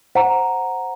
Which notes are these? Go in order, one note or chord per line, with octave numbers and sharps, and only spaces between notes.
C5 F#5 A#5